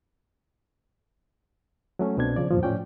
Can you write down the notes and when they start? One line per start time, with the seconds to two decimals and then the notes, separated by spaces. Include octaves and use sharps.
1.99 F#3 A3 C#4
2.17 C2 B2 C4 D4 G#6
2.36 C#3 F3 D5
2.51 E2 G2 A#2 F3
2.63 A2 F3 C#4 D5 G5